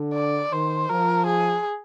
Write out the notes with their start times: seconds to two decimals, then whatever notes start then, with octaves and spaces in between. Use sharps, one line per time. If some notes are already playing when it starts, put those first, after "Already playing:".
Already playing: D3
0.14 D5
0.52 D#3 C5
0.89 F3 A#4
1.27 G#4